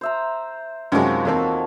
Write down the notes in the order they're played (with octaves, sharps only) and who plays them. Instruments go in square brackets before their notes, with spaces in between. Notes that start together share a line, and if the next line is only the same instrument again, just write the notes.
[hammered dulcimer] C5 E5 A#5
[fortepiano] F#2 C3 G#3 [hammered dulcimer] D#3 F3 F#4
[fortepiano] E2 A#3 C4 [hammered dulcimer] A4 C#5